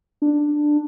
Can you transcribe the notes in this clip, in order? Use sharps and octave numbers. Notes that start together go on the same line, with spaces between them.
D4